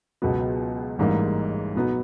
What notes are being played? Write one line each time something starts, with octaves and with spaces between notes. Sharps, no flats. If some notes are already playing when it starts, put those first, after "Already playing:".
C#2 B2 F#3 B3
A1 G#2 E3 G3 A#3
B2 F#3 B3 D#4 F#4